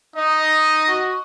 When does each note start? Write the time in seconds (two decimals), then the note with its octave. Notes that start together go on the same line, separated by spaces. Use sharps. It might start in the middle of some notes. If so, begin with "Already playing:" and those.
0.16 D#4 D#5
0.88 F#4